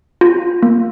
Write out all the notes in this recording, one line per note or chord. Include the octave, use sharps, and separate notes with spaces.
F4
A#3